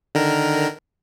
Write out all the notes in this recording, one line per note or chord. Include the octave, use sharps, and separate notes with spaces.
D3 D#3 A#4